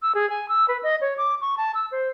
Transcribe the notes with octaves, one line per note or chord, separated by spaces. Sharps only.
E6
G#4
G#5
E6
B4
D#5
C#5
D6
C#6
A5
E6
C5